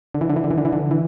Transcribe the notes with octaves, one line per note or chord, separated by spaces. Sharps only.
D3
E3
D3
E3
D3
E3
D3
E3
D3
E3